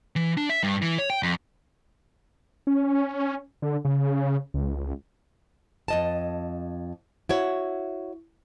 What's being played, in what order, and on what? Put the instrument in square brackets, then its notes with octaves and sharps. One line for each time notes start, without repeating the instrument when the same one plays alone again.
[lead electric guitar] E3
D4
E5
G2
E3
C#5
G5
F2
[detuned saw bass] C#4
D3
C#3
C#2
[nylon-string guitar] F2 D#5 A5
E4 F#4 C#5